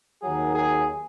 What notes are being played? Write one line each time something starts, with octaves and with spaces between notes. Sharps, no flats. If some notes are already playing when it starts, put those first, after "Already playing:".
D#2 D#3 F#3 G#4
G#4